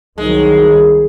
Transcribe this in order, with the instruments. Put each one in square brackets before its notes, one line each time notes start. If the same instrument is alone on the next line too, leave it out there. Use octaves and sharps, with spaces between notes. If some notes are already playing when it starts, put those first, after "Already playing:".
[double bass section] C2 D#3 F#3 [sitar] G#3